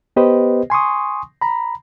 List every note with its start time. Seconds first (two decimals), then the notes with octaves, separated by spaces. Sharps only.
0.16 B3 G4 B4 C5 D#5
0.70 G#5 C6 C#6 D#6
1.41 A#5 B5